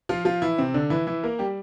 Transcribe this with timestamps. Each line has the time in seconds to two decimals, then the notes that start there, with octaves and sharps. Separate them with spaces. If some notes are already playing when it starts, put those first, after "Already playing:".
0.09 F3 F4
0.25 F3 F4
0.42 E3 E4
0.58 C3 C4
0.74 D3 D4
0.90 E3 E4
1.07 E3 E4
1.23 A#3 A#4
1.39 G3 G4